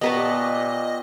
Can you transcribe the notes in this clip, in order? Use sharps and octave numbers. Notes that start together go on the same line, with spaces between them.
A#2 B3 G4 B4 D#5 A5 A#5 C#6